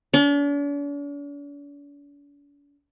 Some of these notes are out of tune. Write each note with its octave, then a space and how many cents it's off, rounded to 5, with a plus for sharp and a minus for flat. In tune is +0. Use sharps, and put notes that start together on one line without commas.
D4 -45